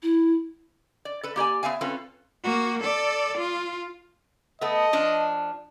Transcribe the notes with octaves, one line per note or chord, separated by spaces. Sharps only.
E4
D5
A4 B4
A#3 G4 D5 G#5
B3 C4 E5 F5 G#5
C4 C#4 F4 A4 B4
A#3 F#4
A4 D5
F4
A3 B3 D#5
F3 D4